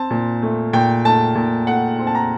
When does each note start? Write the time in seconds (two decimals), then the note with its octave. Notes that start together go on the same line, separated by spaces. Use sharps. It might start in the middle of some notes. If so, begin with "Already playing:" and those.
Already playing: C4 A5
0.10 A#2
0.43 A3
0.73 A#2 G5
1.04 A3 A5
1.35 A#2
1.67 A3 F#5
1.99 C4
2.07 A5
2.15 A#5